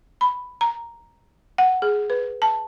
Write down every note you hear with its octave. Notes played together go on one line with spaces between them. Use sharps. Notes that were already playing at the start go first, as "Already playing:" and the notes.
B5
A#5
F#5
G#4
B4
A5